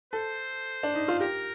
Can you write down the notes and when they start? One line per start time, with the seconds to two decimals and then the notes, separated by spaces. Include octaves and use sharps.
0.13 A4 C5
0.83 D4
0.95 D#4
1.08 F4
1.20 G4 A#4